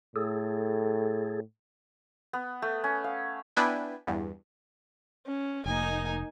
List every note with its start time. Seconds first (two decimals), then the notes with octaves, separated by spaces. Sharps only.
0.16 A2 G#4 A4
2.33 B3
2.62 A3
2.84 C#4
3.04 F5
3.56 B3 D4 E4 B4 G5 G#5
4.07 E2 G2
5.26 C#4
5.66 F1 A#3 D#4 G#5